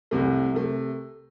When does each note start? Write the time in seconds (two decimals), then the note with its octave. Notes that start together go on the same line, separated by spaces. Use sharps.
0.11 C2 C3 A3
0.54 C3 A3